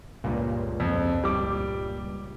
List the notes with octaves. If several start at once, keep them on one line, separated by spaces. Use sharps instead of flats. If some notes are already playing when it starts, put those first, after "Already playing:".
C#2 G2 A#2
F2
G3 D6